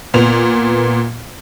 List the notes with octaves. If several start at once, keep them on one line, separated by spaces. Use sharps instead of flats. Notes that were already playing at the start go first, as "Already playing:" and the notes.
A#2 B3 F7